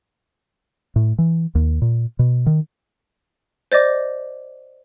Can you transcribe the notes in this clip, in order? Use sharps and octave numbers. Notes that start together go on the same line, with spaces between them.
A2
E3
D#2
A#2
B2
D#3
C5 D5 D#5 D6